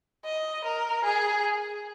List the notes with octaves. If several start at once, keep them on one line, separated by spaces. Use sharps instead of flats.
D#5
A#4
G#4